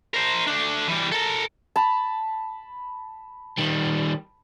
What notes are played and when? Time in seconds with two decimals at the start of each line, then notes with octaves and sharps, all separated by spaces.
0.14 A#4 C5
0.47 A3 D4
0.88 E3 G3
1.12 A4 A#4
1.76 A5 B5
3.58 D#3 G3